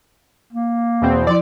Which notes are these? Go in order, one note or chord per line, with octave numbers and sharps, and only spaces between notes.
A#3
E2 B2 C4
F3 E4 D5